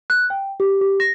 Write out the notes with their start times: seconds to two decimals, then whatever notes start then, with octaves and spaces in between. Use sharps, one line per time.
0.10 F#6
0.30 G5
0.60 G4
0.81 G4
1.00 A#6